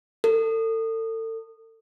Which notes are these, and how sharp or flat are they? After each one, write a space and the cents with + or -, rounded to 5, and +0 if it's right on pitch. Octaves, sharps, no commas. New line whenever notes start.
A4 +35